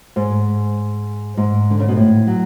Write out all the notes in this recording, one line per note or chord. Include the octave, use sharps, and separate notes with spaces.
G#2
G#2
D3
C#3
B2
A2
F#3